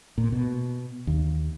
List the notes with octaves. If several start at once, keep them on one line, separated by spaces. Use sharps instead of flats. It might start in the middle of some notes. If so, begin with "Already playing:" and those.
A#2
B2
D#2